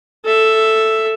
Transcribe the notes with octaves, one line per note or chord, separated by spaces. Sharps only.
A4 E5